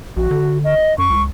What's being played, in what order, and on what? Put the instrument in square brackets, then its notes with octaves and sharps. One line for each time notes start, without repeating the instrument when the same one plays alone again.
[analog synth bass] A#1 [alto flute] F#4
[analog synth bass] D3
[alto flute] D#5
[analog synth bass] F#2 [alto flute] C#6
[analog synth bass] C#2